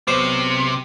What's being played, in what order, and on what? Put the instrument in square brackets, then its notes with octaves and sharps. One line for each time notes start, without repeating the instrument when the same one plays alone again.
[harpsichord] B1 C5 [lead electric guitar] C3